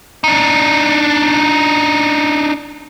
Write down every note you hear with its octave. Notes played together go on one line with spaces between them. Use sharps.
D4 D#4